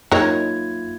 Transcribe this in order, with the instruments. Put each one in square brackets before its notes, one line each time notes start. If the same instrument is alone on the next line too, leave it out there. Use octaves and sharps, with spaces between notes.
[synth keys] F#2 [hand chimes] A#3 F4 G#6 [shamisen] D#4 A#4 C#5